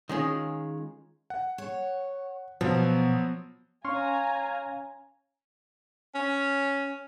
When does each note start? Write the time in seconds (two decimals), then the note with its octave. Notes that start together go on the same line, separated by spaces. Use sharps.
0.09 D#3 G#3 C#4 F4
1.30 F#5
1.58 C#5
2.61 B2 F3 F#3 B3
3.85 C#4 C#5 F5 G#5 A#5 C6 C#6 F6
6.15 C#4